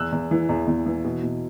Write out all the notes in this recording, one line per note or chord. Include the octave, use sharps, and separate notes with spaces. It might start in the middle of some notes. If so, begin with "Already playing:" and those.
Already playing: E2 E6 F#6
E2
E3
E2
E2
E3
B2
B2